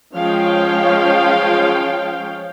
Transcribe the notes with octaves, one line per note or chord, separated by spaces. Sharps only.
F3 G#3 C#4 C#5 F5 G5